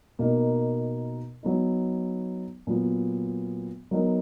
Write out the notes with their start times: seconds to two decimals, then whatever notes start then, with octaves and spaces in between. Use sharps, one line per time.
0.19 B2 A#3 D#4 A#4
1.43 F#3 B3 D#4
2.67 A#2 F#3 B3
3.91 F#3 B3 D#4 A#4